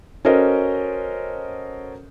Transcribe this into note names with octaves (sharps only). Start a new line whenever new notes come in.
C#4 F#4 A4 A#4 C5 D#5